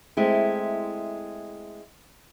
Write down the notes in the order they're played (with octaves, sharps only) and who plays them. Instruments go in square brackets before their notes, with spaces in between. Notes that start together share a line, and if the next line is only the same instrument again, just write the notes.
[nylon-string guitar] G#3 A3 C4 E4